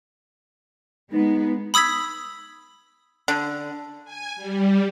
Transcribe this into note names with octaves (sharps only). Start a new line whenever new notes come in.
G#3 B3 D#4
B5 D#6 E6 G#6 B6
D3
G#5
G3